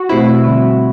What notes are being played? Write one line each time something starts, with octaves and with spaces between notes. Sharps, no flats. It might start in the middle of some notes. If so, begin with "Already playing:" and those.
Already playing: F#4
B2 A3 C4 E4 G4 C5
D3 G3 C4